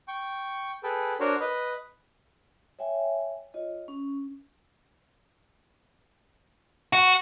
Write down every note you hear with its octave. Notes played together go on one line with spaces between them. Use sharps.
G5 C#6
G#4 A4 B4 G5
D4 F#4 A#4 C5 C#5
B4 D#5
C#5 E5 G5 G#5
F4 C#5 D#5
C#4
F#4